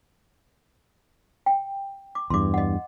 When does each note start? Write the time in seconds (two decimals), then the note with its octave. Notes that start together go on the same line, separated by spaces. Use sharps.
1.46 G5
2.15 D6
2.30 E2 G2 C6 D6
2.54 D#5 F#5